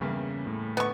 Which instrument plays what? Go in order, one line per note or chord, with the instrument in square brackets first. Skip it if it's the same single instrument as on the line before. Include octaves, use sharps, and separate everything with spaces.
[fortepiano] E2 G2 A#3 [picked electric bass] C#3
[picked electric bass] A2
[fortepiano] D3 [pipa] B3 C#6